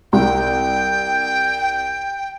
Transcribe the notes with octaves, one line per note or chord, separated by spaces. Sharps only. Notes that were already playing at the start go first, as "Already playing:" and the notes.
C2 G5